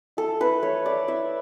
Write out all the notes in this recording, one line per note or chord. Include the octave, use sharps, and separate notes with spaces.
E4 A4
E4 B4
A3 C#5
A3 D5
E4 E5